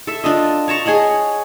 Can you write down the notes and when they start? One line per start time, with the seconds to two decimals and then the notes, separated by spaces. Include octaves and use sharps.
0.07 A4 E5
0.24 D4 F4 D#5
0.68 C#5 A5 A#5 C#6
0.86 G#4 C#5 D#5 F#5